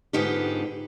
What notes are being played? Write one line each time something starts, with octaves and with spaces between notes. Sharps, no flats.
G#2 D3 B3 D#4 F4 G4